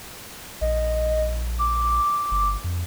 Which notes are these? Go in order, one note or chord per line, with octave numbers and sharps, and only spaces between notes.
A#1 D#5
D6
G1
F2